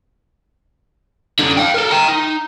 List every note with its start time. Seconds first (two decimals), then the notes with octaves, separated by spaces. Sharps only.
1.39 F#2 D3
1.57 F5 G5
1.74 A4 A#4
1.91 G5 A#5
2.08 D#4